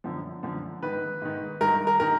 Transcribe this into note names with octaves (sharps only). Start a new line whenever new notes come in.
F#2 D3 F3
F#2 D3 F3
G#2 D#3 B4
G#2 D#3
G2 D#3 A#4
A#4
D#3 A#4